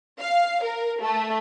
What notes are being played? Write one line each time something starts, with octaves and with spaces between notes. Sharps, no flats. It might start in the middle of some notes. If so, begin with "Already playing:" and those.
F5
A#4
A3